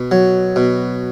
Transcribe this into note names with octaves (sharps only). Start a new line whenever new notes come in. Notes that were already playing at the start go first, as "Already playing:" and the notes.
Already playing: B2
F#3
B2